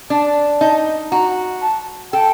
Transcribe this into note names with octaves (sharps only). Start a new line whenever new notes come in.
D4 A5
D#4 A5
F#4 A#5
A5
A4 G5